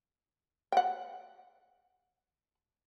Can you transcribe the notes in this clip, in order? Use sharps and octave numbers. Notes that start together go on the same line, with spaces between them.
F#5 G5